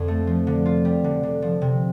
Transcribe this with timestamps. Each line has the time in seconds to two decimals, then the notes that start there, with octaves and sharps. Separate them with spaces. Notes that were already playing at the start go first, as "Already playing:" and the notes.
Already playing: F2 D3
0.08 A3
0.27 F3
0.47 D3
0.65 F4
0.85 G3
1.04 D3
1.23 D3
1.42 F3
1.62 C3